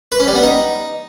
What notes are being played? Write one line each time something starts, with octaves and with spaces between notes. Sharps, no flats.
B4
C#4
G3
B3
D#4